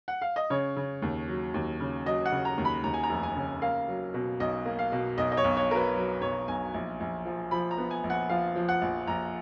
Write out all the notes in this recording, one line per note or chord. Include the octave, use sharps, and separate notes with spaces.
F#5
F5
D#5
C#3 C#5
C#3
D#2
F#3
D#2
C#3
F#3 D#5
F#5
C#3
A#5
D#2
B5
D#2 A#5
G#5
A#5
F1
G#5
C#3
A#3 F5
F#3
B2
B1 D#5
A#3
F5
B2
B1 D#5
D#5
C#5
B1
C#5
F#3 A#4
B4
F#3
B1 C#5
B1 G#5
A#1
A#1
F3
F3 B5
A#5
B3
G#5
A#1
F#5
F3 F5
F3
F#5
A#1
A#1 A#5